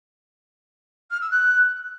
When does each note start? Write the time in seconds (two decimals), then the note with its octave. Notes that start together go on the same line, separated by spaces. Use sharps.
1.11 F6
1.21 E6
1.31 F#6